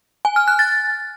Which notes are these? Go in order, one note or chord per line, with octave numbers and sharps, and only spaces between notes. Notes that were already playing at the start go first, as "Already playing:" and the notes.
G#5
F6
F#6
A6